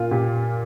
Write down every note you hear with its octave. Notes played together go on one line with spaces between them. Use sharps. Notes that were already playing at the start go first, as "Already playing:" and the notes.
Already playing: A#2 A#3 F4
A#2 G4